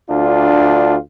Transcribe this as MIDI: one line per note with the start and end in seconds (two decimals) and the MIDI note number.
0.10 0.97 38
0.10 0.97 62
0.10 0.97 65